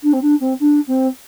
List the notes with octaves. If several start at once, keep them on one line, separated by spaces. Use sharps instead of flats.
D4
C4
D4
C4
D4
C4